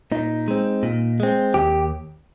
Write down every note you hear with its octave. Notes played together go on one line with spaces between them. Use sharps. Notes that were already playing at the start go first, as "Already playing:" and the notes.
A#2 D#4
G#3 C4
A#2
G#3 C4
D#2 G4